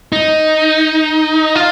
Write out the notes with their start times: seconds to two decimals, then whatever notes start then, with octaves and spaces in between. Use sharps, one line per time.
0.13 D#4
1.55 F4